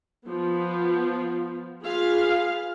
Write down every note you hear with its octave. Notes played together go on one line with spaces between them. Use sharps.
F3 B3
F4 G#4 B4 F5